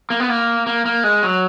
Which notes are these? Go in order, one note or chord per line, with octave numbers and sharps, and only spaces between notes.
A#3
B3
A#3
A#3
A#3
G#3
F#3